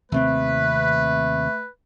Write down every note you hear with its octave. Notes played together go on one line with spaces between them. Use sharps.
D#2 C3 A3 C4 B4